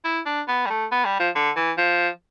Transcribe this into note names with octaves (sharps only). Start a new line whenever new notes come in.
E4
D4
B3
G3
A3
B3
G3
F3
D3
E3
F3